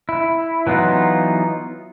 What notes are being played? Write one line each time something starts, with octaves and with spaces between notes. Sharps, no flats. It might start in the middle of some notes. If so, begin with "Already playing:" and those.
E4
E3 F#3 B3 D#4 F4